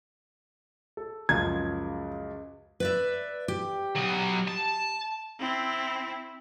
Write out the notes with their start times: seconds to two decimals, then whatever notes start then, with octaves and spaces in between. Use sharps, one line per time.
0.97 A4
1.29 C#2 F#2 F3 G#6
2.80 B4 D5 E5
3.48 G4
3.95 F#3 D#5
4.48 A5
5.40 C4 E4